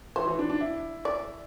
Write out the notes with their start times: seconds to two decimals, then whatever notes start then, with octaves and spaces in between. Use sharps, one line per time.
0.16 E3 C5
0.27 E3
0.39 D4
0.50 D4
0.61 E4
1.05 D5